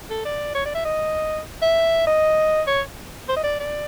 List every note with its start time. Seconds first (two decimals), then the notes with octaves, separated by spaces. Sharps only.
0.10 A4
0.25 D5
0.55 C#5
0.65 D5
0.75 E5
0.85 D#5
1.62 E5
2.07 D#5
2.67 C#5
3.29 C5
3.36 D#5
3.44 D5
3.60 D5